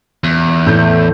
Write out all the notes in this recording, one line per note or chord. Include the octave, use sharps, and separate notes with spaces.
E2
A2 A3 G6